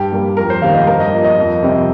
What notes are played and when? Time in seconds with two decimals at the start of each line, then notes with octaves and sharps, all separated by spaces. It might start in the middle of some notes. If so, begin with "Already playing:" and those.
Already playing: G2 G4
0.12 G3 A#3
0.37 F2 A#4
0.50 C5
0.62 D#3 G3 A#3 F5
0.74 D#5
0.87 G2 A#4
1.00 D#5
1.13 F3 A#3
1.25 D#5
1.38 F2
1.63 C3 G3 C4